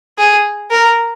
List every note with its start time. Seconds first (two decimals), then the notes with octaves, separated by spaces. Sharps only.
0.18 G#4
0.71 A#4